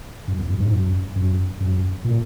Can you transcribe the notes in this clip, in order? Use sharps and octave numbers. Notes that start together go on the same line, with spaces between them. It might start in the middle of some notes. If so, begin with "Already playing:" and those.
F#2
E2
F#2
G#2
F#2
F#2
F#2
A#2